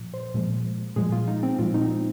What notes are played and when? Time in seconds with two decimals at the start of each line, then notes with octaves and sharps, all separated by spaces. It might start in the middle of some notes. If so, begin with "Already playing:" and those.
Already playing: A#2 F3
0.14 C5
0.34 A#2 F3 G#3
0.96 A#2 F3 G#3 G#4
1.12 F4
1.28 D#4
1.43 C4
1.59 A#2 F3 G#3 F4
1.74 D#4
1.91 C4